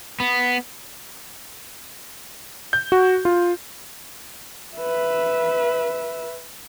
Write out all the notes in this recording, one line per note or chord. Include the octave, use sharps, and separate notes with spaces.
B3
G6
F#4
F4
B4 E5